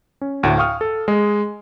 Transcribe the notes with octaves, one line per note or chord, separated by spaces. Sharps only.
C#4
D2 A2
F5 G5 C#6 D#6 F6
A4
G#3 D#5